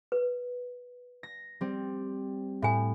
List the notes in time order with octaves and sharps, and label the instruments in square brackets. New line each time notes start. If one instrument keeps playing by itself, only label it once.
[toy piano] B4
[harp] A#6
G3 C4
[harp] A2 [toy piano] E5 G#5